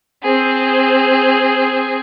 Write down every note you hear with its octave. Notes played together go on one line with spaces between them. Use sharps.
C4 G#4